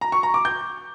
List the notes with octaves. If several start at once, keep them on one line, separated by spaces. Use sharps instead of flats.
A#5
C#6
A#5
D6
G6